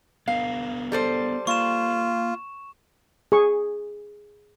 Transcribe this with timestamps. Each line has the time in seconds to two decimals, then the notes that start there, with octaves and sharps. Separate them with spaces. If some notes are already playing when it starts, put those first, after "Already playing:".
0.28 B3 D4 A#4 F5
0.92 G3 A4 C5
1.47 A#3 F4 C#6 E7
3.32 G#4 C#6